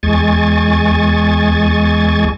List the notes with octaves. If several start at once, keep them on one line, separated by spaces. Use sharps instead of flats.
E2 G#3 G#5 C#6 A6